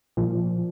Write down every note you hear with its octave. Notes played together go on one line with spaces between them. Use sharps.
A#2 F3